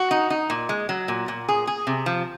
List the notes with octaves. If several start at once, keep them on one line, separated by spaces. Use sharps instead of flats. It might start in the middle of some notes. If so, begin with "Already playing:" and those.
Already playing: F#4
D#4
D#4
A#2
G#3
F#3
A#2
A#2
G#4
G#4
C3
F3